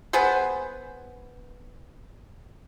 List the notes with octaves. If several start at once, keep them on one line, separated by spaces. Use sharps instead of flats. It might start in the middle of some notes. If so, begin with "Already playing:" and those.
B3 G#4 B4 C5